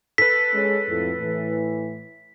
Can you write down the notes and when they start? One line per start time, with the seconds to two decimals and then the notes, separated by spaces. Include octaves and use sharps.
0.18 A4 B4 B6
0.54 G#3 C#4
0.89 F2 A2
1.19 A2 E3